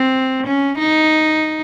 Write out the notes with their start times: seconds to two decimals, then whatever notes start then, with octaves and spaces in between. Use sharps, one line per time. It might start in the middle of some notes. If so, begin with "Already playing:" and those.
Already playing: C4
0.47 C#4
0.78 D#4